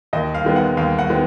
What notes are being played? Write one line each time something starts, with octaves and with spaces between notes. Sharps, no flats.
D#2 D#5
F5
D#3 G#3 B3
F#5
D#2 F5
F#5
D#3 G#3 B3